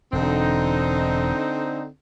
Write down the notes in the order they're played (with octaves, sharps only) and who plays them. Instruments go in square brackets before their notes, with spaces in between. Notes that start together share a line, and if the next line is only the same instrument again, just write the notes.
[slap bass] E1 [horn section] D3 C4 D#4